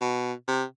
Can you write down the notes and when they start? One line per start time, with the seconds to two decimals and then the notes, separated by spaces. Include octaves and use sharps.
0.01 B2
0.47 C3